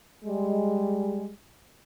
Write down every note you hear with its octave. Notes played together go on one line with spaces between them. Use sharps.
G3 G#3